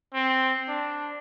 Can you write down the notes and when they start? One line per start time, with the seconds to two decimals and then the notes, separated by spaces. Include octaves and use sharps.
0.14 C4
0.68 D4